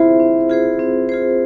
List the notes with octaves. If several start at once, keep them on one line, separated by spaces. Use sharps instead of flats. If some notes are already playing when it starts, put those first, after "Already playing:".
Already playing: C4 E4 F4 G#4 C5
C4
F4 G#4 C5
C4
F4 G#4 C5